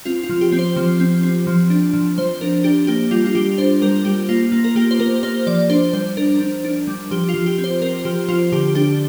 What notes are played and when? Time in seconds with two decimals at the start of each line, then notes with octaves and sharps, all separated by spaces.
0.05 C4 F4
0.23 F4
0.29 F3
0.41 G4
0.52 C4
0.59 C5
0.76 F3
1.00 C4
1.23 C4
1.47 F3
1.70 D4
1.94 F3
2.18 F3 C5
2.41 D4 A#4
2.64 D4 G4
2.87 A#3 G4
3.11 G3 F4
3.26 F4
3.35 G3 G4
3.58 D4 C5
3.82 G3 A#4
4.05 G3 G4
4.29 A#3 F4
4.52 A#3
4.64 A#4
4.76 A#3 G4
4.91 C5
4.99 A#3 A#4
5.23 A#3 C5
5.47 F3 D5
5.70 D4 C5
5.93 G3 C5
6.17 D4 A#4
6.41 D4
6.65 D4
6.87 G3
7.11 F3 G4
7.29 F4
7.34 F3
7.46 G4
7.58 C4
7.64 C5
7.82 C4 A#4
8.05 F3 G4
8.28 F3 F4
8.52 D3 G4
8.75 D4 G4